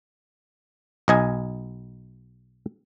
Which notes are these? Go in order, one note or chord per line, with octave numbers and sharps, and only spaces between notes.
B1 D#5 G#5